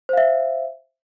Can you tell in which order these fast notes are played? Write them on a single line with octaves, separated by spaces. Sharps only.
C5 F5 E5